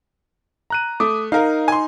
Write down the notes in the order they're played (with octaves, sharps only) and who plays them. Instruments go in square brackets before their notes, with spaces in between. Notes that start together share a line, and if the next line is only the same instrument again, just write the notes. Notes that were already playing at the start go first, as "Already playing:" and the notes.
[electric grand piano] A#5 F#6 D#7
[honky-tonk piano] A3 [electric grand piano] D6 D#6
[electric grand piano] D#4 [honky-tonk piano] A#4 F5
[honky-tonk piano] G#5 C6